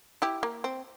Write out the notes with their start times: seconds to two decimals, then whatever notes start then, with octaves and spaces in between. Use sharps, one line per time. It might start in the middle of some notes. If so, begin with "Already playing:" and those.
0.22 E4 G4
0.43 A#3
0.64 C4